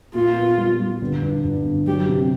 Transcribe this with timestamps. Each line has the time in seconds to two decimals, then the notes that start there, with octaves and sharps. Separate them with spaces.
0.15 A#2 F4
0.36 B3
0.58 G3
0.79 G3
1.01 G1
1.22 G2
1.44 G2
1.65 G1
1.87 F#3 G4
2.09 C3